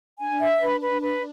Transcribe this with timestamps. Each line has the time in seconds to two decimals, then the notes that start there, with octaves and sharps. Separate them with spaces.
0.19 D4 G#5
0.39 E5
0.60 B4
0.80 B4
1.01 D4 B4